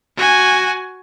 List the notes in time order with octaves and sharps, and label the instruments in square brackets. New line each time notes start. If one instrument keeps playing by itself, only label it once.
[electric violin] F#4 G#5